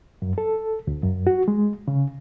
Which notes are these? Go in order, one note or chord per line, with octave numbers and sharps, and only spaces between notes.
F#2
A4
D2
F#2
F#4
G#3
C#3